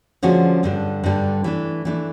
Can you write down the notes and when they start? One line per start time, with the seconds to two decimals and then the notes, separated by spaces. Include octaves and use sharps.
0.23 D3 F3 G#3 C#4 F#4
0.63 G2 D3 G3
1.03 G2 D3 G3
1.44 E3 A3 D4
1.85 E3 A3 D4